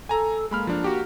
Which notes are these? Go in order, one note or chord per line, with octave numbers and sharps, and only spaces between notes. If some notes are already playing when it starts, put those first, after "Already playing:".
A4 G#5 A#5
G#3 A#3 B5 F6
F3 D4
F#4 G4